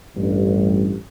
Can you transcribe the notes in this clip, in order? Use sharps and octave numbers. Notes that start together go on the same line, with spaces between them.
A1 G2